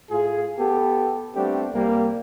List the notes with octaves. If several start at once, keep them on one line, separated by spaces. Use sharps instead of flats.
A2 F4 G#4
B3 G4 A4
G3 A3 B3 C4 D4 G4
C2 G3 A#3